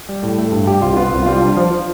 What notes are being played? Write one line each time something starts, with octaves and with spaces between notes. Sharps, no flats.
G3
A2
A3
G2
G3 G4
C2 F4
B3 F4
C2
G3 F4
D4
F3